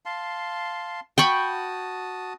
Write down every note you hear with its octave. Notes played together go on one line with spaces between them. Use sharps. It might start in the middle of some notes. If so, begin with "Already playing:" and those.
F5 A5 C6
F#4 G5 A5 B5 C#6 D#6